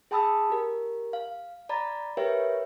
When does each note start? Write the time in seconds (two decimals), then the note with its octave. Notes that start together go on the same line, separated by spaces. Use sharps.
0.11 G#4 G5 A5 B5 D#6 E6
0.50 G4 A#4
1.13 F5
1.69 D5 A#5 B5 A6
2.17 G4 A#4 B4 C#5 E5 G5